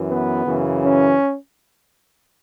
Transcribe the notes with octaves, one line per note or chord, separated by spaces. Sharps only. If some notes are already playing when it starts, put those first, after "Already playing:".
Already playing: F#2 E3
B3
F#2 C#3 E3
C#4